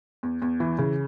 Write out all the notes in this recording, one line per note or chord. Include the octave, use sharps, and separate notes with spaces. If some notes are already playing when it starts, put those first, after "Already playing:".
E2
E2
E3
C#3